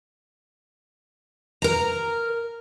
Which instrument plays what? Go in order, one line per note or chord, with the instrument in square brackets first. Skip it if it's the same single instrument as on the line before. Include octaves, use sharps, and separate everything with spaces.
[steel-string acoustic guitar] A#4 A#5